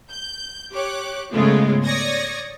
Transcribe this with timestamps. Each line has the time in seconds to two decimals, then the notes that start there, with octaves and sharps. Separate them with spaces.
0.10 G6
0.72 G4 C#5 D6 F#6
1.32 G#2 C#3 G#3 A3 B3 F4
1.84 C#5 D5 C#6 D#6 G#6 A#6